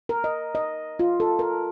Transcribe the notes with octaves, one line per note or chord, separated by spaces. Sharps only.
A#4
D#5
D#5
F4
A4
A#4